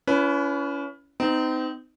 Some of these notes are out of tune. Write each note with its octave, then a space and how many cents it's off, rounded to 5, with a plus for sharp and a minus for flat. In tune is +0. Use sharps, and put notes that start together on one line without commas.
C#4 +30 E4 +30 B4 +0
C4 -35 D#4 +0